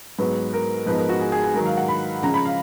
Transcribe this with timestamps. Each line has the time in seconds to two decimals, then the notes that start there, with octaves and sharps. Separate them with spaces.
0.19 G#2 F#3 B3 B4
0.53 A#4
0.86 G#2 F3 B3 D#4 B4
0.98 A#4
1.09 F#4
1.21 G#4
1.32 G#4
1.44 G#4
1.54 G#2 D#3 F#3 A#4
1.65 F5
1.77 F#5
1.88 B5
2.22 C#3 F3 G#3 C#4 A#5
2.34 B5
2.45 F5